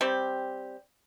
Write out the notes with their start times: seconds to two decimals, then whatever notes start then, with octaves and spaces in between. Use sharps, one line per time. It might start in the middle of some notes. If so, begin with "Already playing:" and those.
0.01 G3 C4 G4